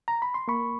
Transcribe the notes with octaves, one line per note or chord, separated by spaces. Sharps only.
A#5
B5
C6
A#3 B5 C#6